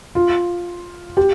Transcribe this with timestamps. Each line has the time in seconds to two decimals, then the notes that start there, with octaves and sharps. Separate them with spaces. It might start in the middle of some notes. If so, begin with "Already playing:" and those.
0.15 F4
1.17 G4